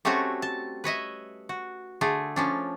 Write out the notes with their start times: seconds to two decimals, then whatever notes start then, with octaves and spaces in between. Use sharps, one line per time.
0.05 G3 A3 C4 C#4 F#4 C#5
0.42 A5
0.84 B4 C#5 D#5 E5
1.49 F#4
2.01 D3 A3 G#4
2.36 F3 C#4 D4